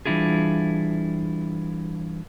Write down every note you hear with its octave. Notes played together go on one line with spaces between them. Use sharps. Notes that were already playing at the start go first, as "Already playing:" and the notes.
E3 G3 D4 E4 F4 G#4